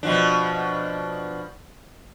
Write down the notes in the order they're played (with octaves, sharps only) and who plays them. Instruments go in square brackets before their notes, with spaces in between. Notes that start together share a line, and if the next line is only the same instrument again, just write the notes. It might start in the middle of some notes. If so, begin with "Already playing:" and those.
[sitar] B2 F3 D4